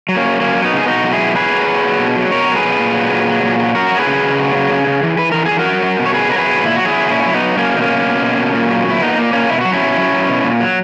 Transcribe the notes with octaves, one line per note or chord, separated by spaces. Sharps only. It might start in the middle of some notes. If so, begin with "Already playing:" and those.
F#3
A#3 C#4
F#3
F#3 A#3 C#4
F#3
B3 D#4
C#3 G#4
B2 D#4 F#4
F#3
E4 G#4
B2
F#3 G#4 B4
F#3
F#3
F#3
B2
F#3
B2 A#4 C#5
F#3
G#4 B4
B2
A#2
F#3
A#2
F#3
A#2
F#3
F#3 F#4 A#4
F#3
G#4 B4
C#3
C#3
F#3
C#3
C#3
C#3
E3
E3 B4
E3 A#4
G#4
E3
F#4 A#4
F#3
F#3
B2
C#5
F#3 G#4 B4
F#3 A#4
G#4 B4
B2
A#2 E4
F#3 F#4
E4 G#4
F#3
A#2 C#4 E4
F#3 E4
B3 D#4
F#3
F#3 A#3 C#4
B2 D#4
A#3 C#4
B2
B2
B2
B2
A#2
F#3
A#2 E4
A#2 B3 D#4
A#2 A#3
A#2 A#3 C#4
B2 E4
F#3 F#4
C#4 E4
B2
F#3
F#3
B2
A#2
F#3